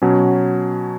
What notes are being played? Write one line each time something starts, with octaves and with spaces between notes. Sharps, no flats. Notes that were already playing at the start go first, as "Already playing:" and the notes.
B2 F#3 C#4